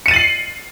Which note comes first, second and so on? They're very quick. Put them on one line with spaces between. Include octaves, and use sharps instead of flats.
C#7 D#7 A6 F#7 C7